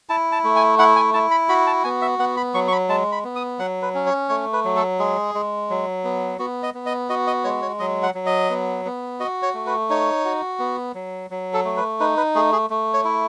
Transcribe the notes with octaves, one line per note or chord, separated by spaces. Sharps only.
E4 A5
A5
A3
G#5
E4 F#5
G#5
E4 A5
B5
F#4 B5
A5
B3 G#5
E5
B3 F#5
B5
F#3 C#6
C#6
B5
G#3 A5
B5
B3
D#6
F#3 F#5
B4
C#4
C#5
A3 C#5
B4
F#3
A4
G#3 G#4
G#3
F#3
B3
B3 F#4
D#5
B3
D#5
F#4 D#5
D#5
G#3 C#5
C#5
F#3 D#5
F#5
F#3
D#5
B3
B3
F#4 D#5
C#5
A3
B4
D#4 C#5
F#4
B3
F#3
F#3
A4
A3
B4
D#4 B4
B4
A3 G#4
G#4
A3
C#5
E4